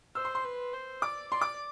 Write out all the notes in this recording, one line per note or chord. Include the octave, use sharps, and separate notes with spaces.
C5 E6
C6
C6
B4
C5
D5 D6
D5 C6
D6